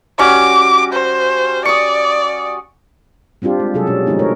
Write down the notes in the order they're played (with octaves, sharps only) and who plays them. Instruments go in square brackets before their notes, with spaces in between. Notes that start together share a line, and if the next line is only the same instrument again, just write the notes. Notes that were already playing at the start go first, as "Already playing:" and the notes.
[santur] G3 C#4 F#4 [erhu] D6
[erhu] C5
[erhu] D5 [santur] C#6 D#6
[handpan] G3 C4 D4 F4 G4
G#3
C3 F#3 G#4 A4
B2 C#4 G#4
D3 F3 G#3 C4 D#4
A3 A#4 C#5